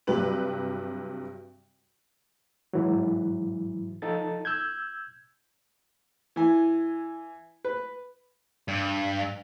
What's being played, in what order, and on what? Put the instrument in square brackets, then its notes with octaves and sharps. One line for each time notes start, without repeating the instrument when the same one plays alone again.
[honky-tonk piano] G2 C3 F#3 G4 B4 F#7
[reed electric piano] G#2 E3 F#3
F3 D#4 A4 A6
E6 G6 G#6
[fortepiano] E3 G#5
B4
[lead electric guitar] G2